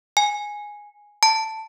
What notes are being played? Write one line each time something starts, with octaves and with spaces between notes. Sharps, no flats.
G#5
A5